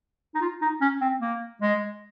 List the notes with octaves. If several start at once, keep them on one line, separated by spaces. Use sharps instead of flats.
D#4
F4
D#4
C#4
C4
A#3
G#3